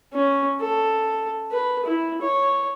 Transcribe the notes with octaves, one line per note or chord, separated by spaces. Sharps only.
C#4
A4
B4
E4
C#5